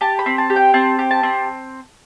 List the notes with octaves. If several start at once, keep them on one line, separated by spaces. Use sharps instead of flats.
G4 A5
B5
C4
A5
G4
G5
C4 A5
G4
A5
C4